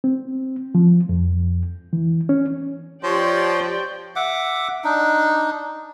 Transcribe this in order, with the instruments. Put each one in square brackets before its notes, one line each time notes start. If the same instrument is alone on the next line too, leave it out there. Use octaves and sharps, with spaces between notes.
[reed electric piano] C4
F3
F2
E3
C#4
[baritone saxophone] F3 [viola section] G4 D5 G5 [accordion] C#5 C6
[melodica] E5 F#5 D6
D4 D#4